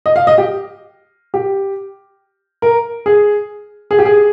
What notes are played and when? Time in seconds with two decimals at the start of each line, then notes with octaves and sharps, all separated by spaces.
0.06 D#5
0.16 F5
0.27 D#5
0.38 G4
1.34 G4
2.62 A#4
3.06 G#4
3.91 G#4
3.99 G4
4.05 G#4